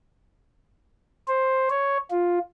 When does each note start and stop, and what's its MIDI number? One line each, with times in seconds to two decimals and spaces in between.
1.28 1.69 72
1.70 1.98 73
2.11 2.39 65